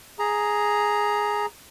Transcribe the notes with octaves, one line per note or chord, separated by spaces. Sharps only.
G#4 A#5